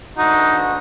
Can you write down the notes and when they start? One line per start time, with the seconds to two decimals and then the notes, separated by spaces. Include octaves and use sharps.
0.18 D2 E3 D#4 F#4